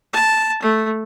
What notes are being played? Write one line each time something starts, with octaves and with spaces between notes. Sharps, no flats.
A5
A3